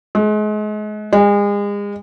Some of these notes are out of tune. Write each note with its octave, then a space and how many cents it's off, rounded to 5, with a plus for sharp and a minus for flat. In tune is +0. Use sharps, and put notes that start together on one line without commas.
G#3 +35
G#3 -35